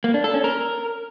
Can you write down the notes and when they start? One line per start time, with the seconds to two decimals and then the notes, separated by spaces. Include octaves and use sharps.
0.04 A#3
0.14 D4
0.24 A4
0.34 C#4
0.44 A#4